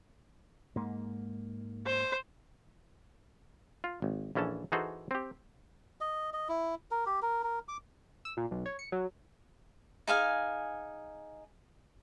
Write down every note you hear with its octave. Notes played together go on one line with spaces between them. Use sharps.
G#2 A#3
C5
F4
G#1
A#1 E3 C#4 A4 A5
E3 D#4 F#4 G#4 A4 C5
C4 G4
D#5
D#5
E4
A#4
G4
A#4
A#4
D6
E6
A#2
B1
C#5
C#7
F#3
D#4 G#4 F5 G#5